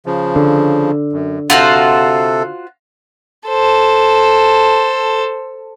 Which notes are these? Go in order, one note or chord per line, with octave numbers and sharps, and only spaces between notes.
C#3 F3
D3
F#2
C3 F4 F#4 A4 C5
A4 C5